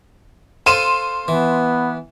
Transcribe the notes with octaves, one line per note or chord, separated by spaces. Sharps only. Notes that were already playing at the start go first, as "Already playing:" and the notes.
A4 C5 F5 C6 D#7 E7
E3 B3